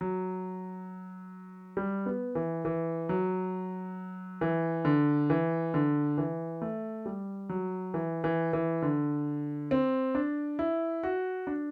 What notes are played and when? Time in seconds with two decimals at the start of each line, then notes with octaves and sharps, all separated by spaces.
0.01 F#3
1.77 G3
2.06 B3
2.35 E3
2.65 E3
3.09 F#3
4.41 E3
4.85 D3
5.30 E3
5.74 D3
6.18 E3
6.62 A3
7.06 G3
7.49 F#3
7.94 E3
8.24 E3
8.53 E3
8.82 D3
9.71 C4
10.15 D4
10.59 E4
11.03 F#4
11.47 D4